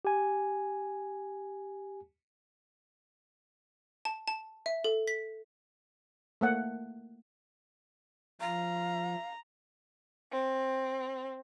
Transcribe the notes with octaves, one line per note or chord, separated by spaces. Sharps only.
G4 G#5
A5
A5
E5
A4
B6
A3 A#3 F#5
F3 F5 A#5
C4